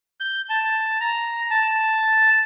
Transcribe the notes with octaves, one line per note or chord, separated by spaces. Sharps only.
G6
A5
A#5
A5